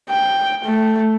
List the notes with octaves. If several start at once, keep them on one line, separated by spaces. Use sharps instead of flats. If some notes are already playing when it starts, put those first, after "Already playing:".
G5
A3